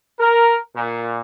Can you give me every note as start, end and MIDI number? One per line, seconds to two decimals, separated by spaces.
0.19 0.56 70
0.75 1.21 46